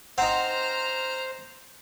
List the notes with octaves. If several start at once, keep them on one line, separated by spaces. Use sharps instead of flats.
C4 D#4 C5 F#5 A#5 F6